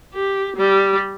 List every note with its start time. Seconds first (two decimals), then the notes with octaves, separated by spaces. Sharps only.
0.14 G4
0.57 G3